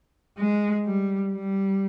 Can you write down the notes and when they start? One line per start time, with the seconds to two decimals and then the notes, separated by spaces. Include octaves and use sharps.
0.38 G#3
0.85 G3
1.33 G3